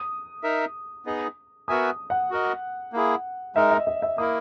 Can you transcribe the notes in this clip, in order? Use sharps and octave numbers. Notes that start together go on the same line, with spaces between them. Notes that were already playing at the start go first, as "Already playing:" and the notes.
Already playing: D#6
D#4 A#4 E5
B3 D#4 G#4 D#5
B3 F#4 A#4 E5 G#5 D#6
F#5
F#4 A#4 D#5
A#3 E4 G#4
G#3 D#4 A#4 E5
D#5
D#5
E5
A#3 E4 A#4 D#6